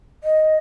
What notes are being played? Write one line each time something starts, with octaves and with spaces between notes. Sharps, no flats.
D#5